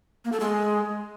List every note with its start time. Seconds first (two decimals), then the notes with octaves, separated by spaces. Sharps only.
0.25 A#3
0.32 A4
0.40 G#3